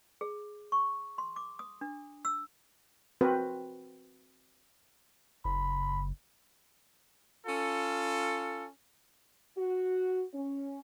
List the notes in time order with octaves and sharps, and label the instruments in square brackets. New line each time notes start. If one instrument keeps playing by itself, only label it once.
[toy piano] G#4
C#6
C6
D6
D#6
D4
E6
[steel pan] C4 F#4 A#4 B4
[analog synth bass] F#1 [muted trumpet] B5
[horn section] C#4 F4 A4
[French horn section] F#4
C#4